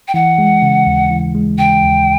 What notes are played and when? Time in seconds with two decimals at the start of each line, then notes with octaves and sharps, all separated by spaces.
0.08 G5
0.14 E3 F#5
0.38 G#3
0.62 C#3
0.87 D#2
1.11 E3
1.35 G#3
1.58 C#3 G5
1.83 D#2